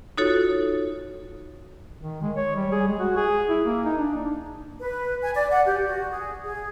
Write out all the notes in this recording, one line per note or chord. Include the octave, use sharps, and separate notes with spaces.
D#4 F4 F#4 A4 C#5
D#3
G#3
C#5
G3
G#4
G#3
F#4
G#4
E4
A#3
D#4
D4
B4
G#5
D5
F#5
G4
F#4
G#4
G#4